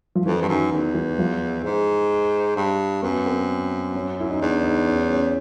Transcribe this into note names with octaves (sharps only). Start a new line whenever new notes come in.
F3
F2 E3
G2
F#2 D#3
E2 D#3
E3
F3
G#2
G2
F#2 B3
C4
C#4
E4
D#4
E2 D4
D#4
C#4
C#4